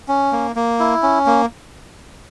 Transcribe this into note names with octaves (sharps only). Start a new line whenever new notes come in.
C#4
A#3
A#3
E4
C#4
A#3